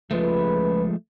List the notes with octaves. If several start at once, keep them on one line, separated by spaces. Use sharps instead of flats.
C#2 F3 G#3 A3 B4